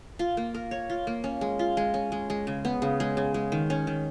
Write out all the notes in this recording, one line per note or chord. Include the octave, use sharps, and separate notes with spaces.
F4
A#3
A#4
C#5
F4
A#3
C#4
G#3
F4
G#3
C#4
G#3
G#3
C#3
B3
C#3
G#3
C#3
G#3
D#3
C#4
D#3